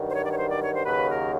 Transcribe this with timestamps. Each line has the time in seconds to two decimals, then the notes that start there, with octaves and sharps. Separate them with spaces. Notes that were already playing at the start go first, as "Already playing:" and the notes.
Already playing: G2 D#3 F#3
0.08 C5
0.14 C#5
0.23 D5
0.31 C#5
0.38 C5
0.50 D5
0.62 C#5
0.74 C5
0.86 D#2 C#3 F#3 B4
1.09 A#4